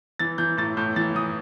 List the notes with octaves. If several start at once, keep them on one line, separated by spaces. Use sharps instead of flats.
E3 A6
E3 G6
A2 A6
A2 G6
E3 A6
E3 D#6